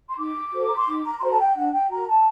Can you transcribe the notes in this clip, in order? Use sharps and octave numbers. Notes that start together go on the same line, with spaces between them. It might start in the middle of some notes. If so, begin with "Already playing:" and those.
C6
D#4 D6
F#4 A4 C5
A#5
C6
D#4 D6
A#5
C6
F#4 A4 C5 A#5
A5
G5
D4 F#5
G5
F#4 A#4 A#5
A5